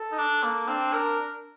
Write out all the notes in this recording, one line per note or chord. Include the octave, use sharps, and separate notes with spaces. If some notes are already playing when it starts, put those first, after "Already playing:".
Already playing: A4
D#4
D4
A#3
C4 D4
A#4